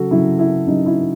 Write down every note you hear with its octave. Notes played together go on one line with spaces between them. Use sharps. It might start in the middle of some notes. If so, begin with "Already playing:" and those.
Already playing: C#3 F#3 F#4 A4
C#3 F#3 E4
E4
C#3 F#3 D#4
E4